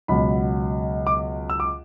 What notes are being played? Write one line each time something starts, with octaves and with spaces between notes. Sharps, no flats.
C#2 B2 F#3 B3 B5
D6
E6
D6